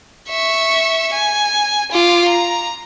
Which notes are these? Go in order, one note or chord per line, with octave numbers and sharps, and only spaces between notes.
E5 C#6
G#5
F4 D6
A#5